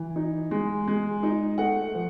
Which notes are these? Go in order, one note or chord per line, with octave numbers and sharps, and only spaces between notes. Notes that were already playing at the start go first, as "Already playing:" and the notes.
Already playing: E3
D#4
G#3
G#3
D#4
A3 F#5
F3